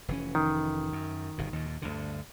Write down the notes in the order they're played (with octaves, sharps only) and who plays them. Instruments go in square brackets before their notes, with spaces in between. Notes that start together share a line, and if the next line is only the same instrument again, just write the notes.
[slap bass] F1 E3 C#4
[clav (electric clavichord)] D#3
[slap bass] F#2
G1 B2
D#2 A#2
D2 G2 D3